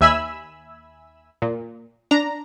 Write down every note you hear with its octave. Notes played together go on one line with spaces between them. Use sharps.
D#2 E5 G#5 B5 E6
A#2
D4 A#5